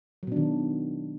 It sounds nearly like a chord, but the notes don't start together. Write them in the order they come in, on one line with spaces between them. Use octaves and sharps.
F#3 B2 D4 D#3